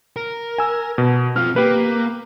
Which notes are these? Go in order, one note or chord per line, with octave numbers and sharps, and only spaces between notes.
A#4
G#5 E6
B2
C4 F4 F6
A#3 G4 B4